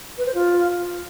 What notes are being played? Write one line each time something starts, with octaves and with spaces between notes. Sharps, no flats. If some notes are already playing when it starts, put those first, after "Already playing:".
B4
C5
F4